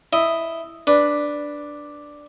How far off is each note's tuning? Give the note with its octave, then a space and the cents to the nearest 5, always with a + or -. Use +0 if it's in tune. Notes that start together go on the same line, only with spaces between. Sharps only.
E4 +0 D#5 +0
D4 +0 B4 +0